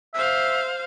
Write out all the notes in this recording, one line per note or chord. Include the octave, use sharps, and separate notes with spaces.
C5 E5 F5